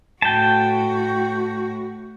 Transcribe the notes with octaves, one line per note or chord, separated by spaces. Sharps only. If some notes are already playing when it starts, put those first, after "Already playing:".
A2 F#4 G5 A5